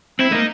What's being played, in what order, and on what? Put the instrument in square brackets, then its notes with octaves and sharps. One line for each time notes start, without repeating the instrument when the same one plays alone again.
[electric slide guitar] C4 [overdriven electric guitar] E4
[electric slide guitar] A3 A#3 [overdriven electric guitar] D#4